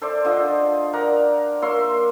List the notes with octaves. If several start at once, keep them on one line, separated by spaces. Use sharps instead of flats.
A4 C5 D5 E5
D3 F3 D#5
A#4 D5 F#5 A#5
A#3 C#5 E5 C6